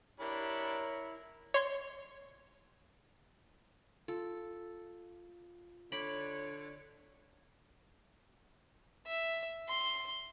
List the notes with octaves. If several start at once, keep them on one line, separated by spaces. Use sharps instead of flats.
D4 E4 G4 A#4 C#5 B5
C#5 C6 G#6
F4 A4
D3 C#5 D5 B5
E5
C6